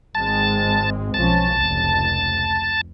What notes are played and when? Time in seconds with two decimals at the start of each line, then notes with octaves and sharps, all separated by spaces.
0.15 G#1 G#3 C4 A5
1.14 B1 F3 C#4 A5
1.53 F1 C#2